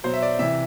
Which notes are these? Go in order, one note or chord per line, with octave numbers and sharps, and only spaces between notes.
B2 F#3 C5
E5
D5
C3 E3 E5